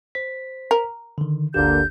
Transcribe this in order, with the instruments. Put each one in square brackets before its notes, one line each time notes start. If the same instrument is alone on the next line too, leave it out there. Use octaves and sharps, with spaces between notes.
[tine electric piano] C5 B6
[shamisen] A#4
[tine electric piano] D3 D#3
[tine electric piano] G1 D2 G4 [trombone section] D3 A#3 [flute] G6